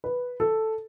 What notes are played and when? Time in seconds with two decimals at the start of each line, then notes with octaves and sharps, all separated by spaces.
0.04 B4
0.40 A4